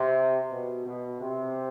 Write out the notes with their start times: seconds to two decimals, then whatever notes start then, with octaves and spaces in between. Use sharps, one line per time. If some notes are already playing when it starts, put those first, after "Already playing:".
Already playing: C3
0.50 B2
0.85 B2
1.21 C3